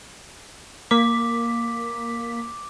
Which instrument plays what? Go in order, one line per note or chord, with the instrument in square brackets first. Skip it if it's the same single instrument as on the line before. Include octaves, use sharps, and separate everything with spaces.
[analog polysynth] A#3 B6 [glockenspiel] D6